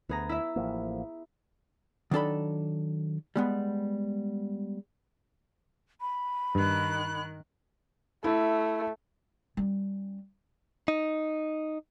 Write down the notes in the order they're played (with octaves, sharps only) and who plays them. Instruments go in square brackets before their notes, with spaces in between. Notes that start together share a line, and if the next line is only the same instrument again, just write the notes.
[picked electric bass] D2 [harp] B3 G#4 A#5
[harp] E4 E5
[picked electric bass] A1 F3 A#3
[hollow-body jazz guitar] D#3 F#3 D4 A4 B5
G3 G#3 B3
[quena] B5
[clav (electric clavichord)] G2 [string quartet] D#3 F#6
[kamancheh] A3 [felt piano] E4
[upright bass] G3 C#4
[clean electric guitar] D#4